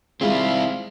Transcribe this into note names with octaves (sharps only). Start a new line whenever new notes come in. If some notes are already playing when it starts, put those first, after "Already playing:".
D#3 G3 G#3 C4 E4 F4 G#4